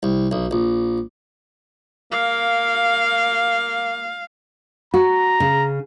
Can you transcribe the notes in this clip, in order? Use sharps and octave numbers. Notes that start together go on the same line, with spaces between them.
C2
B1
A#1
A#3 F5
F#4 A#5
C#3